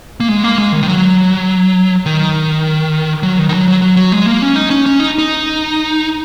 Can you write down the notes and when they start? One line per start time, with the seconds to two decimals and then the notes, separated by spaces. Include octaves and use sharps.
0.20 A#3
0.29 G#3
0.43 A#3
0.58 G#3
0.72 D#3
0.83 D#3
0.88 F#3
2.06 D#3
3.23 F#3
3.39 D#3
3.49 D#3
3.53 F#3
3.68 F#3
3.82 F#3
3.97 F#3
4.12 G#3
4.26 A#3
4.42 C#4
4.56 D#4
4.70 C#4
4.86 C#4
5.00 D#4
5.18 D#4